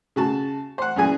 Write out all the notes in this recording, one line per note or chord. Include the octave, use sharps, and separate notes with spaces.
C#3 F#4 A5
C5 F#5
F#2 A#2 E3 G#4 G#5